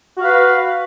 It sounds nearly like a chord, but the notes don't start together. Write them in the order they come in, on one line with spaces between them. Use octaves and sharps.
F#4 F5 B4